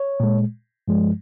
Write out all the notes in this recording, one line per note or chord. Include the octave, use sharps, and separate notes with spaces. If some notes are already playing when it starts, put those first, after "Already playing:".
Already playing: C#5
A#2 G#3
G2 F3 G#3